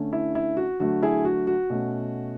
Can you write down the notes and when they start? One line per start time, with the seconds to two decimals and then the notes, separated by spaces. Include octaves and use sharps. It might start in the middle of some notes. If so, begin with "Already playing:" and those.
Already playing: D3 A3 C#4
0.13 E4
0.35 E4
0.57 F#4
0.80 D3 F#3 A3 F#4
1.03 E4 G#4
1.25 F#4
1.47 F#4
1.70 B2 A3 C#4